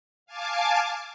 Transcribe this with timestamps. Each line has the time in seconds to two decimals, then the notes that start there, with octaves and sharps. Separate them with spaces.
0.26 F5 G#5 A5 D6